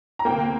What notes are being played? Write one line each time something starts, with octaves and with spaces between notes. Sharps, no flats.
A#5
D2 C3 A#3 G5